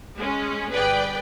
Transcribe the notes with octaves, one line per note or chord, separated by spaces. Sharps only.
G#3 C#4
G1 G#4 B4 D5 G5